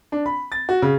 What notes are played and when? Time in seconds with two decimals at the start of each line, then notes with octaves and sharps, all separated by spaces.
0.12 D4
0.26 B5
0.52 A6
0.69 F#4
0.82 C#3